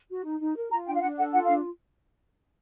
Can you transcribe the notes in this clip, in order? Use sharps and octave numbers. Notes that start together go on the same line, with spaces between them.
F#4
D#4
D#4
A#4
F4 A#5
D4 G5
F5
D4 F#5
A4 F#5
F4 F#5
D4 F5